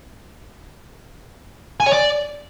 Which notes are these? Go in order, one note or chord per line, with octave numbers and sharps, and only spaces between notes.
G#5
C#5
D5